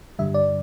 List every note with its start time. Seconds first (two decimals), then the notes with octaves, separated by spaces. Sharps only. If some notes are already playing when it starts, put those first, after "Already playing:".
0.19 G2 D3 G3 E5
0.34 D5